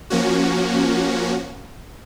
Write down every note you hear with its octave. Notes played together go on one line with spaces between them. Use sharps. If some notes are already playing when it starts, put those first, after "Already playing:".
F3 A#3 C#4 F#4